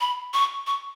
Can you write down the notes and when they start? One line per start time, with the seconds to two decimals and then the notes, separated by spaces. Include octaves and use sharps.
0.01 B5
0.34 C#6
0.67 C#6